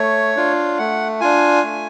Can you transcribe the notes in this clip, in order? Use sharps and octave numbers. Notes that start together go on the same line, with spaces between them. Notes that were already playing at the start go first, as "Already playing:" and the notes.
Already playing: A3 C#5
D4 F4
A3 F#5
D4 F4 G#5
A3